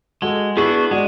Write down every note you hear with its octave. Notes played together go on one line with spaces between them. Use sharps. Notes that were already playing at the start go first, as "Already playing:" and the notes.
G#3 F#4 A4
B3 D4 E4 F#4 G#4
G#3 D4 F#4